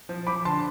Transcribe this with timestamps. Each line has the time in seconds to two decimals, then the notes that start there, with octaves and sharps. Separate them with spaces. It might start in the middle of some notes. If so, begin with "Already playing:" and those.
0.09 F3
0.27 F3 B5 D6
0.45 D3 A5 C6